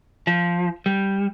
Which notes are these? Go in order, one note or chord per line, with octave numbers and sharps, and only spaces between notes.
F3
G3